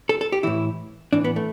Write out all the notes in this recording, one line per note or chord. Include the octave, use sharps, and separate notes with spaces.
A4
A4
G4
A2 E3 E4
A2 E3 D4
B3
A3